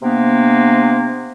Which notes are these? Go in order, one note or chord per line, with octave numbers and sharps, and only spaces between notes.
C3 A#3 B3 D4